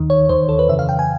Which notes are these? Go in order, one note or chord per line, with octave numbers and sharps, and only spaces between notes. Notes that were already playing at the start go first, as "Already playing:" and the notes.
Already playing: D#2 D#3
C#5
D#2 D#3 C5
A4
B4
F2 C#3 E3 E5
F5
G5
G#5